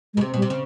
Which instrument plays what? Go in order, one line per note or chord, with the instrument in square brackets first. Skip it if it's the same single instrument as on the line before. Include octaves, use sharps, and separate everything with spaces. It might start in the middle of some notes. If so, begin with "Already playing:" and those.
[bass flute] G#3
[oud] B2
C3
[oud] B2 [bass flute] G3
[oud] C3
C#3